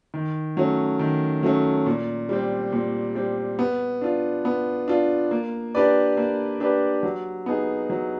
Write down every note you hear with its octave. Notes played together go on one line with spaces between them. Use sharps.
D#3
F#3 A3 C#4
D#3
F#3 A3 C#4
A#2
G3 C4
A#2
G3 C4
B3
D4 F4
B3
D4 F4
A#3
D4 G4 B4 D5
A#3
D4 G4 B4 D5
F#3
B3 D#4 G#4
F#3